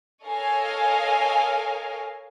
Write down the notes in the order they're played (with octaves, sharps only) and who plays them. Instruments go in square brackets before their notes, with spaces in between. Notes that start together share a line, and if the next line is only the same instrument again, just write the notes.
[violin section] A4 A#4 C#5 D#5 F5 G#5